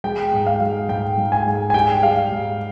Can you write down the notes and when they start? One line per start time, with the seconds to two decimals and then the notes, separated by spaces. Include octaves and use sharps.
0.04 G#3 G5
0.33 G#2
0.47 F5
0.60 G#3
0.89 G#2 G5
1.17 G#2
1.32 G#5
1.46 G#2
1.70 G#5
1.74 G3 G5
2.03 G3 F5
2.32 G#2